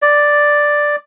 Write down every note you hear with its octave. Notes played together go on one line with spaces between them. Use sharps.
D5